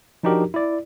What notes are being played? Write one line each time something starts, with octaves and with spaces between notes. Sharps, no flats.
F3 D4 D#4 F#4 G4 A#4
E4 D5